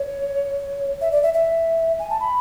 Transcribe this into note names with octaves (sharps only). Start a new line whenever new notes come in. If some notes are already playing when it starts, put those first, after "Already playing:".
Already playing: C#5
E5
D5
E5
E5
G#5
A5
B5